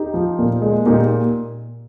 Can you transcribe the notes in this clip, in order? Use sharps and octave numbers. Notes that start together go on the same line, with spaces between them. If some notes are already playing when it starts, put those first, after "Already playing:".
Already playing: D#4 G4
F3
A#2
G#3
A#2 D#4 G4